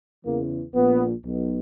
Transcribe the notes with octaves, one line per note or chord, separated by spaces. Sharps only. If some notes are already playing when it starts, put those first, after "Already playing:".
E2 C#3 E3 A#3
A#1 A#2 B3
B1 B2